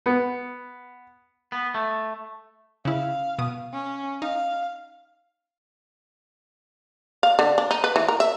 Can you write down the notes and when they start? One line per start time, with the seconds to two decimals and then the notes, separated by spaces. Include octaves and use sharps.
0.06 B3
1.52 B3
1.74 A3
2.85 C#3 E4 F5
3.38 B2 D#6
3.72 C#4
4.22 D#4 F5
7.23 F5
7.39 D3
7.58 D4
7.71 D#4
7.84 B4
7.96 E3
8.08 A#4
8.20 E5